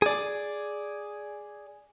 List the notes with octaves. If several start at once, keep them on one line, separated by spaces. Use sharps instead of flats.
G#4 D5